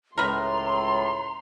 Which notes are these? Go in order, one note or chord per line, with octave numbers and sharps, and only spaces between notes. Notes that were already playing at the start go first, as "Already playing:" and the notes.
C#2 A2 A#4 B4 A#5 C6